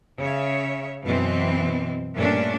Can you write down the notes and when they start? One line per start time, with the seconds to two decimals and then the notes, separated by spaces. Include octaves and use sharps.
0.20 C#3 C#5 E5
1.04 F#2 B2 E3 C4
2.15 G2 A#2 A3 C#4 D4